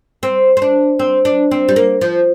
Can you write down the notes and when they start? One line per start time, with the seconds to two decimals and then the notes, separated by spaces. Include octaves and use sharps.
0.23 C4
0.57 C4
0.62 D4
0.99 C4
1.25 D4
1.51 C4
1.68 G3
1.76 A#3
2.01 F3